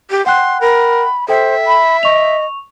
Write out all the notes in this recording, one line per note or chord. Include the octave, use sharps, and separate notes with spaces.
G4
F#5 G5 C6 F#6
A#4 B5
A4 C5 E5 G5
B5
D#5 C#6 F7